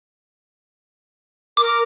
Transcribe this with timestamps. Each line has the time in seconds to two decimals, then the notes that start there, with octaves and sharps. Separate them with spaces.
1.57 A#4 D6